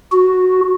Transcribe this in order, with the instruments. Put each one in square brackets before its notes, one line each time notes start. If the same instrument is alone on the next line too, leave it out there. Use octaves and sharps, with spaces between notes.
[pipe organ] F#4